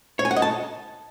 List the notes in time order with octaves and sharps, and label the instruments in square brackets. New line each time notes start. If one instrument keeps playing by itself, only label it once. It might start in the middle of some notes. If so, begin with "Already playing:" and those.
[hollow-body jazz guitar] C#5
G#5
F#5
D#5
A5